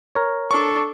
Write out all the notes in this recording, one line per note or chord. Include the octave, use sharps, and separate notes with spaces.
A#4 C#5
D4 A4 C#6